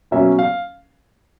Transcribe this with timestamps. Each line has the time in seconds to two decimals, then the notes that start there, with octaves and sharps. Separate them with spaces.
0.11 B2 F#3 A#3 C#4 E5
0.39 F5